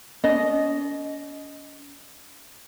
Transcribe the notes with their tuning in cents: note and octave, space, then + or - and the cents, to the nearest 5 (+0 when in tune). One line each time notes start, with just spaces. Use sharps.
C#4 +40 D#5 +0